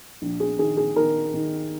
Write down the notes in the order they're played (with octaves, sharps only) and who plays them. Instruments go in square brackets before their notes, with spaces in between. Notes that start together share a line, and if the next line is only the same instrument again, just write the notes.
[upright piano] A#1
G#4
D#3 G#4
G#4
D#3 A#4
D#3